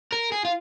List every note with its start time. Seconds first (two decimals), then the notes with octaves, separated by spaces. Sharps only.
0.13 A#4
0.32 G#4
0.45 F4